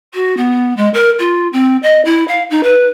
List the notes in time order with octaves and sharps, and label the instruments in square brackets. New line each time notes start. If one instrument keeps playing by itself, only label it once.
[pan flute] F#4
B3
G#3
A#4
F4
C4
D#5
E4
F5
D#4
B4